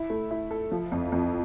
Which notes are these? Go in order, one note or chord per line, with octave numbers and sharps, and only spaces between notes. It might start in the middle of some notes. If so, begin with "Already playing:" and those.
Already playing: E4
A3
E4
A4
F3
F2
F2